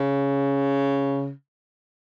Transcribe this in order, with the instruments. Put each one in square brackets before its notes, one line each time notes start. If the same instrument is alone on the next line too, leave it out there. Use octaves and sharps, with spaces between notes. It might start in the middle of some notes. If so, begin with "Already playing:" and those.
Already playing: [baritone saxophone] C#3